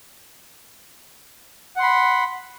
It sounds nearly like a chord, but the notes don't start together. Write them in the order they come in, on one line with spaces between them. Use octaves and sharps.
F#5 C6 B5